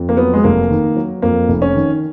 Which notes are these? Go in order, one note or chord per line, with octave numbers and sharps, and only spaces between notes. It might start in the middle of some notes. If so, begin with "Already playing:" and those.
Already playing: F2
A#3
F#3 B3
G#3
F1 A#3
D#3
F#3
F2 A#3
F1
C#4
D#3